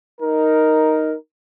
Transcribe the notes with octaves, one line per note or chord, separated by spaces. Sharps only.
D#4 A#4